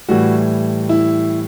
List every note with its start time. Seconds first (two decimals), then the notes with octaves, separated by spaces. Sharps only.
0.08 A2 E3 G3 F#4
0.89 E4